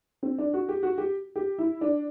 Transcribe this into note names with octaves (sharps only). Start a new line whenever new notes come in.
C4
D4
F#4
G4
F#4
G4
G4
E4
D4